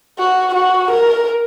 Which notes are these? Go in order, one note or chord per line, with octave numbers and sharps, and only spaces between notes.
F#4
F#4
A#4